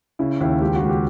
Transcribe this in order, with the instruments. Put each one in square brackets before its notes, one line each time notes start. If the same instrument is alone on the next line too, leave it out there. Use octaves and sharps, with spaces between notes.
[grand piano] C#3 E4
D#2 E4
C#2 G4
F#4
C#2
G4